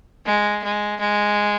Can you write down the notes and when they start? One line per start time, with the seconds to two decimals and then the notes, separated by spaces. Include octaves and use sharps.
0.25 G#3
0.63 G#3
1.00 G#3